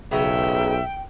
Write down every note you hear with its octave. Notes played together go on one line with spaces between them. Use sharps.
B1 C#3 B3 E5 G5 A#5